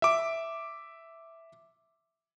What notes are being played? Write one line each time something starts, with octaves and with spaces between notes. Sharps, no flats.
E5 D6